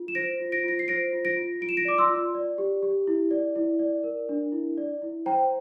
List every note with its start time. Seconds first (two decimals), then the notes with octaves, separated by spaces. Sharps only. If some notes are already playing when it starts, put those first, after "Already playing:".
Already playing: F4
0.08 E7
0.15 C5 A#6 D7
0.40 F4
0.52 A#6 D7
0.64 F4 A#6
0.79 C7
0.88 C5 A#6 D7
1.13 F4
1.25 A#6 D7
1.37 F4
1.61 F4 D7
1.69 E7
1.77 A#6 D7
1.85 D5 D6
1.98 C6 E6
2.09 F4
2.34 D5
2.58 G4
2.83 G4
3.07 E4
3.31 D5
3.56 E4
3.79 D5
4.04 A#4
4.29 D4
4.52 E4
4.78 D5
5.02 E4
5.26 C5 G5 A#5